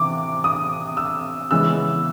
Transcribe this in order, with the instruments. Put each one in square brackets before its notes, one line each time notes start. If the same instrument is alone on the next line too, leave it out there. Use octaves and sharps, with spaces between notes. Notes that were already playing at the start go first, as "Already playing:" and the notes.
Already playing: [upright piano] C3 E3 D6
D#6
E6
C#3 E3 G#3 B3 E6